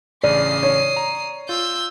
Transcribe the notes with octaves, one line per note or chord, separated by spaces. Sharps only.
A1 C#3 D5 D#6 C7
C#5
A#5
F4 E6 G6